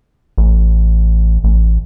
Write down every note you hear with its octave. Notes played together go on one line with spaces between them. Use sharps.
A1
A1